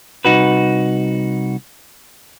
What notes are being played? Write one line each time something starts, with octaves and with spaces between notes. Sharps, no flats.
C2 D#4 F#4 B4